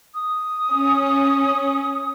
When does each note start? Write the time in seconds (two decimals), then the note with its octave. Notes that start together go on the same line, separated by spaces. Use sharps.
0.15 D#6
0.72 C#4